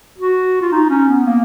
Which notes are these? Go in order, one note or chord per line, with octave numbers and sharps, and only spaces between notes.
F#4
F4
D#4
C#4
B3
A#3